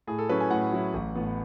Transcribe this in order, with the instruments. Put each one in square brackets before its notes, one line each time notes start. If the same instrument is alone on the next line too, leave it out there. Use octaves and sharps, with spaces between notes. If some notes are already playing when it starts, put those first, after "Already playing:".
[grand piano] A2 G#4
A4
F#3 C#4 E4 B4
G#5
A2 F#5
F#3 C#4 E4
A1
A2 E3 B3